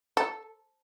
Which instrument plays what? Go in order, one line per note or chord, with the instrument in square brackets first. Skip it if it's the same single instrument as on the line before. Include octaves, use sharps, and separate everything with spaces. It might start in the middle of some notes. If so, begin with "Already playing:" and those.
[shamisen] A4